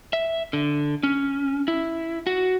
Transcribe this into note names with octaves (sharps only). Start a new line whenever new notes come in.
E5
D3
C#4
E4
F#4